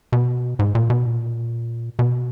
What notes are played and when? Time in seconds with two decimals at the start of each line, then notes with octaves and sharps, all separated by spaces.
0.13 B2
0.59 G#2
0.75 A#2
0.90 B2
1.06 A#2
1.99 B2